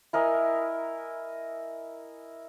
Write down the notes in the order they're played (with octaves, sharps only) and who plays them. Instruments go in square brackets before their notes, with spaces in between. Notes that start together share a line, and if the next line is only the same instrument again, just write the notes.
[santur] E4 A#4 D#5 G#5